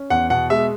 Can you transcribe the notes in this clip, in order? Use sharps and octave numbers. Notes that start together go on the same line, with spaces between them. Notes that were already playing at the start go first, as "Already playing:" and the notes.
Already playing: C#4
E2 F#5
B2 F#5
G#3 E5